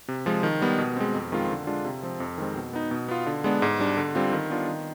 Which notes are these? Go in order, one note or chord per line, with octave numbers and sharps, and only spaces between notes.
C3
F3 G#3
D#3
G3 B3
B2
G#3 C4
F2
D#3 G#3 C4 F4
D3
G#3 D4 F4
C3
F3 C4
F2
D#3 G#3 C4
B2
B3 D#4
B2
B3 F4
D3
G#3 B3 D4
G#2
G3 D4
D3
G3 C4 F4
D#3
B3 D4 F4
D#3